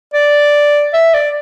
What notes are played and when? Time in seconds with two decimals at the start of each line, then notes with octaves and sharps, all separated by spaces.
0.14 D5
0.93 E5
1.14 D5